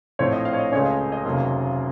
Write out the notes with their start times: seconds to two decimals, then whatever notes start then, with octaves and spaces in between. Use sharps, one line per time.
0.19 A#1 A2 F3 C4 C#5
0.32 D#5
0.45 F5
0.53 C#5
0.59 D#5
0.71 C#2 C#3 A3 C#4 C#5
0.85 D#5
1.12 D#5
1.25 F1 D#2 C#3 F#3 A#3